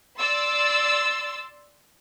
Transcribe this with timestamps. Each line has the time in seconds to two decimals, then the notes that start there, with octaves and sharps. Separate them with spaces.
0.18 D5 C6 E6 A6